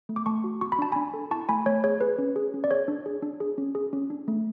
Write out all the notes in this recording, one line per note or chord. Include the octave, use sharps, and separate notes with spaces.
A3
D6
A3 A5 C#6
F#4
F#4 C#6
B5
D4 A5
D4 G#5 B5
A4
E4 A5 C#6
A3 G#5 B5
A3 C#5
G#4 C#5
G#4 B4
C#4
G#4
C#4
D5
G#4 C#5
D4
G#4
D4
G#4
C#4
G#4
C#4
D4
A3